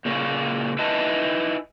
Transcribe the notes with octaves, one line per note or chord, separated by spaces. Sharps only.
A#2 C#3 A#3 C#4
D#4 E4 B4 D#5 G#5 A5